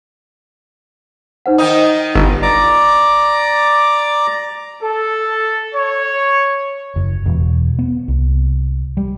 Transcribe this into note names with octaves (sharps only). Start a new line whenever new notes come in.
D#4 C5 F#5
D#3 D#4 D#6
G1
D5 A#5 D6
A4
C#5
F#1
E1
B3
C2
G3